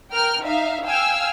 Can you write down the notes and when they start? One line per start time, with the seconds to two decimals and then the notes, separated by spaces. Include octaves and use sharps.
0.13 A#4 G5 F6
0.44 D#4 E5 F5
0.85 F5 G5 G#5 E6 F6